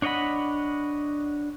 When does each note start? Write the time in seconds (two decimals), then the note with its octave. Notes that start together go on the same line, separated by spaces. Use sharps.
0.02 D4 C#5 D#5 F#5 B5